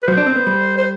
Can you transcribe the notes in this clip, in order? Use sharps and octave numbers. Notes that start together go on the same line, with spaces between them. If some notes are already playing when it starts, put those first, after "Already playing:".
B4
F#3 C5
D4
C4
B3
G3
C5